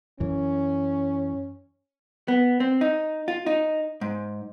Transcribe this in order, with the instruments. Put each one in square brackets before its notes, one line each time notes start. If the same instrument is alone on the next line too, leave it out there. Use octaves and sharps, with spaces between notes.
[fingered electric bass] F#2 E3 [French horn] C#4
[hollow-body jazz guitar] B3
C4
D#4
F4
D#4
G#2